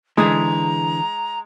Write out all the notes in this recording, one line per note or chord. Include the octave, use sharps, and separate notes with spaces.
D3 E3 G#3 G#4 A#5 D#6